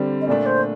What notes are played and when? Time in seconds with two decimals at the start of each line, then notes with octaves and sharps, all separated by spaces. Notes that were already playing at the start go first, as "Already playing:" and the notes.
Already playing: D3 G3 C4
0.21 D#5
0.28 A#2 A3 D4 D5
0.46 C5